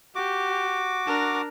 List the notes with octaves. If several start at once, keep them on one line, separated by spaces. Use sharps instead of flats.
F#4 G4 D6
D4 A#4